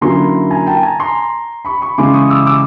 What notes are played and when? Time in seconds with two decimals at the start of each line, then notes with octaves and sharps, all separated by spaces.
0.01 D3 F#3 A#3 C#4 E4 A#5 C6
0.51 G#5 A#5
0.67 G5 A5
0.83 G#5 A#5
1.00 A#5 C6
1.65 B5 C#6
1.81 B5 C#6
1.98 C#3 E3 G#3 C#4 E4 C6 D6
2.14 C#6 D#6
2.30 D6 E6
2.46 D6 E6